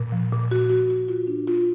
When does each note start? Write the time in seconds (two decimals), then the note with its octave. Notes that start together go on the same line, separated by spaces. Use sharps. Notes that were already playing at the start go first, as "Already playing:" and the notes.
Already playing: A#2
0.12 F3
0.32 A#2
0.51 F#4
0.70 F#4
0.90 F#4
1.08 F4
1.27 D4
1.47 F4